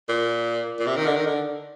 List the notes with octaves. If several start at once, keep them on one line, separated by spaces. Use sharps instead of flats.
A#2
A#2
C3
D#3
D3
D#3
D3